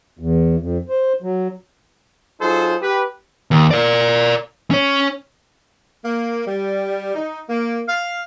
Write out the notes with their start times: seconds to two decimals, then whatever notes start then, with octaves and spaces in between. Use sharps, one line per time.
0.19 E2
0.60 F2
0.89 C5
1.22 F#3
2.41 F#3 D#4 F4 G#4 A4 C5
2.82 G4 B4
3.51 D#2
3.71 A#4 D5
4.71 C#4 C#5
6.05 A#3
6.46 G3
7.15 D#4
7.49 A#3
7.88 F5